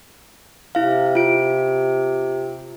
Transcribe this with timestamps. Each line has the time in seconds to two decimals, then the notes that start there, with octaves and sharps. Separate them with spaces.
0.75 C3 E4 F5
1.15 F4 D7